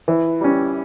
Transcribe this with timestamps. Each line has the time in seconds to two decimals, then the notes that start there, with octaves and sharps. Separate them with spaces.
0.08 E3
0.41 G3 C#4